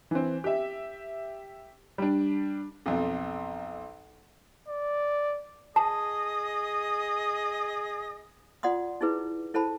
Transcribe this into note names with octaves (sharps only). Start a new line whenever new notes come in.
E3 C4
G4 E5
G3 D4
B1 F2
D5
G#4 D#5 A5
F4 D5 F#5 C6 D#6
D#4 E4 G#4 B4
E4 A4 C5 A5 B5